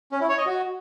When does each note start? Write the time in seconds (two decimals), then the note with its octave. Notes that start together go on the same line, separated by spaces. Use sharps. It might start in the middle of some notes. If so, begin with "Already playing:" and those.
0.12 C#4
0.21 E4
0.29 C#5
0.38 D#5
0.46 F#4